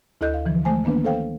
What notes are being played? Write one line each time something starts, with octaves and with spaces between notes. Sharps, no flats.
D2 E4 A4 D#5 F#6 G6
F5
D3 E3 F3
G#3 A3 C5 G#5
D#3 A#3 B3 D4 B4
A4 C5 F5 G5